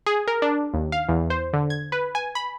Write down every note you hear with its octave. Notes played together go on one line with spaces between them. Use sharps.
G#4
A#4
D4
D#2
F5
E2
C5
D3
G#6
B4
G#5
B5